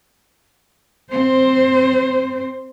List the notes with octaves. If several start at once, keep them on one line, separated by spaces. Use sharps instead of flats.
C4 C5